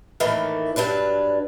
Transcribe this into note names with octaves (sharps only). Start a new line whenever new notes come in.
A2 D#3 E3 A3 A#3
G2 F#3 D4 B4